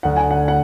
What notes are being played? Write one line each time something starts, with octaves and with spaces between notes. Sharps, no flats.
D2 F#5
G#5
F#5
F#5